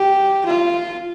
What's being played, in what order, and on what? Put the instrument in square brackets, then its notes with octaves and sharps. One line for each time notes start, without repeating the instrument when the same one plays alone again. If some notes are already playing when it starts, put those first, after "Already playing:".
Already playing: [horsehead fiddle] G4
F4